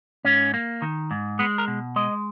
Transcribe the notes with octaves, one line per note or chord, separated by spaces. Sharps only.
G#2 C#4
A#3
D#3
G#2
G#3 B3
A#4
B2
G#3 D#5